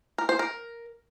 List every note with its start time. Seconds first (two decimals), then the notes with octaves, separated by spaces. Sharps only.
0.18 A#4
0.29 C5
0.39 A#4